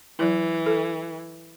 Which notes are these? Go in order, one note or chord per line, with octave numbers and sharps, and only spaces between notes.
E3 F#3 E4
A4